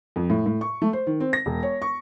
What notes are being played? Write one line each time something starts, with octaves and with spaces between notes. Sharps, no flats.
F2
A2
A2
C#6
A3
C5
D#3
C4
A#6
E1
C#5
C#6